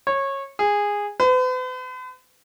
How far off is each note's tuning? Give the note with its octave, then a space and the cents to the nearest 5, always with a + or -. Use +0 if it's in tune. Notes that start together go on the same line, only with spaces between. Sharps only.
C#5 -20
G#4 -15
B4 +45